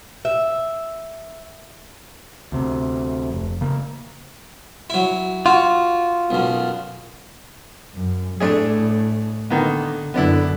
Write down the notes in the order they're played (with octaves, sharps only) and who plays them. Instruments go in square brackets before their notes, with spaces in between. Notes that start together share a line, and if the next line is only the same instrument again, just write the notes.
[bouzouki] E5
[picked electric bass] D2 C3
F1
C#3 A#3
[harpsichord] F#3 E4
[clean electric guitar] F4 [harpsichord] F#4
[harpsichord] B1 F#2
[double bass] F#2
[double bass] A2 [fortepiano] A3 D4 G#4
[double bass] D3 [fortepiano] D#3 A#3 B3
[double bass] F#2 D3 [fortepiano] B3 D4 E4